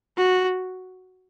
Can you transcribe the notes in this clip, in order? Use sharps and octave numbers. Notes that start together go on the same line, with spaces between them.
F#4